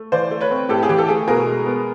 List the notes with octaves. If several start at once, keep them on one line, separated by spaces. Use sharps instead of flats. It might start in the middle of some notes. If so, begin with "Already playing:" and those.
Already playing: A3
E3 C5 D5
A3
B4 C#5
C4
A2 G4 A4
G#4
E3 G4
A4
A3 G#4
B2 G#4 A#4
G#3
B3